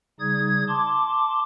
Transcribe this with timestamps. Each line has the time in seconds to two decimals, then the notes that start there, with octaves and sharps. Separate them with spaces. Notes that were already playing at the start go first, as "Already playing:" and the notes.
0.20 C#3 G3 D#4 D5 D#6 G#6
0.68 A5 C6 D6